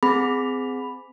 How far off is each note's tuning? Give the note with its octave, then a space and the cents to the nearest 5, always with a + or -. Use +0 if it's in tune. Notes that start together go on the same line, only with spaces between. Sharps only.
C4 -30 G#4 +0 B5 +0